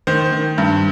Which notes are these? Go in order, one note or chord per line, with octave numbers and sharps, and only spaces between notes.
D#3 C5
D#3
G2